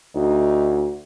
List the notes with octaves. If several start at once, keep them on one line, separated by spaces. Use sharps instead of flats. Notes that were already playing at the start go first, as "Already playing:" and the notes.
D2 D#4